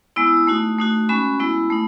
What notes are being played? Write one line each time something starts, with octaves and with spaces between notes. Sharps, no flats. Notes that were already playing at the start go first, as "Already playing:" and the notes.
G#3 B3 E4 E6
D#6
D#6
A3 D#4 F#4
A3 D#4 F#4
G#3 C#4 F#4 B5
G#3 B3 E4
A3 D#4